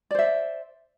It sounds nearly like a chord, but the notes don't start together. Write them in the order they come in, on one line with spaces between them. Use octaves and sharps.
D5 C5 E5